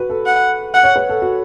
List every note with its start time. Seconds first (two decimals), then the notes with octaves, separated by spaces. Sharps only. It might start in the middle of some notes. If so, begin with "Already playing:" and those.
Already playing: F#4 B4
0.10 A4
0.26 F#5
0.74 F#5
0.83 C#5
0.96 B4
1.09 A4
1.22 F#4